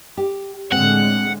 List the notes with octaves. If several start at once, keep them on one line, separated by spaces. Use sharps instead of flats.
G4
A2 D3 G#3 C4 F#5